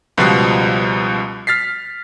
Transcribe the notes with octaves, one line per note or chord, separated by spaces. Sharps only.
C#2 B2 F3 G3 F#6 C7
F6 A6 B6 C7